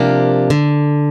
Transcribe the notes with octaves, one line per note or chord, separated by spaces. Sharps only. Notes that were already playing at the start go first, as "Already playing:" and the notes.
Already playing: C3 F3 A#3 D4 G4
D3